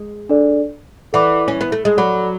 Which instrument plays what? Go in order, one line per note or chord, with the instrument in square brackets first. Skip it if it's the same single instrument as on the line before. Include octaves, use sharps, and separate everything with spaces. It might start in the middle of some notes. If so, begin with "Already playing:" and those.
Already playing: [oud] G#3
[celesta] D4 A4 D5
[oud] E3 [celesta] A4 D5 F#5 B5 D6
[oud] C#4
B3
A3
G#3
[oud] F#3 [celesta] A4 D5 F#5 B5 D6